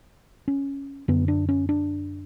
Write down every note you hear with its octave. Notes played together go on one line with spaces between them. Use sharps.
C#4
F#2 D3 B3
D4
C#4
D4